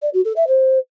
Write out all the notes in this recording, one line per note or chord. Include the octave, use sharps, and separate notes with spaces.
D5
F#4
A4
E5
C5